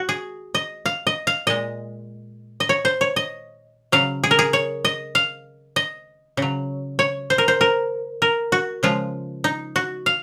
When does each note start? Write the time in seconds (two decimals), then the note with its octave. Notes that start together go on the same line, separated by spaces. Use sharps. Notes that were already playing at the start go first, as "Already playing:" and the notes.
Already playing: F#4
0.09 G#4
0.55 D#5
0.86 F5
1.07 D#5
1.27 F5
1.47 A#2 G#3 D#5
2.60 D#5
2.69 C#5
2.85 C5
3.01 C#5
3.16 D#5
3.92 C#3 F#3 F5
4.23 G#4
4.31 A#4
4.39 G#4
4.53 C#5
4.85 D#5
5.15 F5
5.76 D#5
6.37 C#3 F#3
6.99 C#5
7.30 C5
7.38 A#4
7.48 C5
7.61 A#4
8.22 A#4
8.52 F#4
8.83 C#3 F3 G#3 F4
9.44 D#4
9.76 F#4
10.06 F5